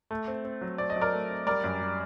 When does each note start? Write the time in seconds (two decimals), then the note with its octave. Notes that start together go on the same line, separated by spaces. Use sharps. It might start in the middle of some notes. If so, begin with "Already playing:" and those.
0.11 A3
0.28 C4
0.45 C4
0.61 F#3
0.78 C4 D5
0.90 D#5
0.96 F#3
1.01 A#4 D5
1.13 A3
1.29 C4
1.47 G3 A#4 D5
1.64 F#2
1.81 G3